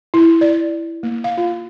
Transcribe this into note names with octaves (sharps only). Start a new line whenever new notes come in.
E4
D5
A#3
F5
F4